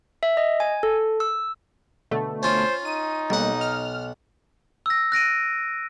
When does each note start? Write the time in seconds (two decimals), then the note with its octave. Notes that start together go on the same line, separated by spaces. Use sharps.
0.23 E5
0.37 D#5
0.60 G#5
0.83 A4
1.20 E6
2.11 B2 D3 A3
2.43 C#4 F4 C5
2.85 D#4 D#7
3.30 B1 G3 A#3 F#5
3.61 F6
4.86 E6 A#6
5.12 F#6 A#6 D7 D#7